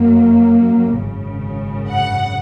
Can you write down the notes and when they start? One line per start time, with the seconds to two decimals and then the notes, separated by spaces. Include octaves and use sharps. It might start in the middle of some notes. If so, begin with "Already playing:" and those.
Already playing: F#2 F#3 A#3
0.98 G#1 F#2 C#3
1.89 F#5